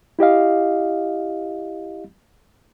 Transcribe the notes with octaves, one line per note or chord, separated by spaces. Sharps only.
E4 G4 D#5 F5